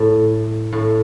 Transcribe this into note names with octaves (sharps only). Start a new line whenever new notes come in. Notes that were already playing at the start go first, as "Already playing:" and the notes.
Already playing: A2
A2